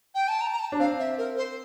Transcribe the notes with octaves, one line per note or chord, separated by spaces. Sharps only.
G5
A5
A#5
A#5
A5
D4
C4 F5
E5
A#4
C5